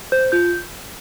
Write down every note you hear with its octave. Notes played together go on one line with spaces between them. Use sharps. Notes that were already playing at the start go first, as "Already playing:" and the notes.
C5 G6
F4 G6